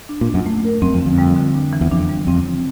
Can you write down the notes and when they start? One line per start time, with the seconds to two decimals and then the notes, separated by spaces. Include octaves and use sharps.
0.09 D4
0.21 A#2
0.28 D4
0.34 F#2
0.46 A3
0.65 A#4
0.82 F#2 C4
0.94 F2
1.00 D3
1.06 F2
1.18 G3
1.36 D3
1.54 D4
1.73 E3
1.81 E2
1.91 F2 D4
2.09 G3
2.27 F2 C4
2.45 C#3